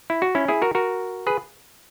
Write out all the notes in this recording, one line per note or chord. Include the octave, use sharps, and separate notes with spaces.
E4
F#4
C#4 E4
E4 G#4
F#4 A#4
F#4 A#4
G#4 B4